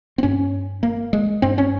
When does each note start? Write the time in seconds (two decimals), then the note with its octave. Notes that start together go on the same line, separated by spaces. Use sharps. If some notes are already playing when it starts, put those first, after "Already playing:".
0.18 C4
0.23 G2 C#4
0.83 A#3
1.13 G#3
1.42 G2 C4
1.58 C#4